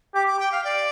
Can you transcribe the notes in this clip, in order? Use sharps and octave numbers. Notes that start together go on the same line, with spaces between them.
G4 D6
D6
G5
F5
D5